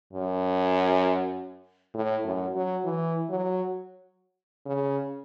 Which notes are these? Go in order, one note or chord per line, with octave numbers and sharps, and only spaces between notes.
F#2
A2
F#2
F#3
E3
F#3
C#3